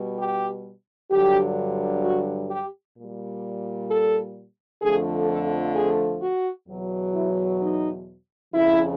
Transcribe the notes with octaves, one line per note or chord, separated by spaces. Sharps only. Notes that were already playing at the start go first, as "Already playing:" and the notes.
Already playing: B2 G3
G4
G2 D3 F#3 G4
F#4
G4
A#2 G3
A4
F2 D3 F3 A3 G#4
A4
G#4
F#4
E2 B2 F#3
E4
D#4
F2 C#3 F3 E4